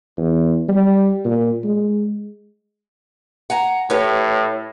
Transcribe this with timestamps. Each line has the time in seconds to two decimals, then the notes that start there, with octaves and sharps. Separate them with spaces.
0.17 E2
0.68 G3
1.24 A#2
1.64 G#3
3.50 F#5 G#5 A#5
3.90 A2 G4 B4 C#5